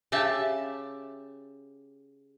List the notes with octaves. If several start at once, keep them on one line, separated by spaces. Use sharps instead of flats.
C#3 G4 E5 A5